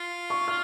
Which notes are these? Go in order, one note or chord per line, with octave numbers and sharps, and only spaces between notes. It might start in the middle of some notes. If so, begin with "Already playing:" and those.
Already playing: F4
C#6
F6